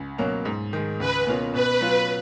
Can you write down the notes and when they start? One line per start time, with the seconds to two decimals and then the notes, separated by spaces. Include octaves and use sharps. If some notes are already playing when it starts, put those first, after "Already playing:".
Already playing: C#2
0.18 B2 F#3 A#3 C#4
0.45 G#2
0.73 D#3 G#3
1.00 C#2 B4
1.27 B2 A#3 C#4 F4
1.54 B2 B4
1.81 F#3 C#4 F4